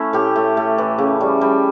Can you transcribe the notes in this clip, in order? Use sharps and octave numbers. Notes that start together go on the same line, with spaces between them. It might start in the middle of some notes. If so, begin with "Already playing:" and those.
Already playing: A3 C#4 E4
A2 G4
A3
A3
E3
C#3
G3
G3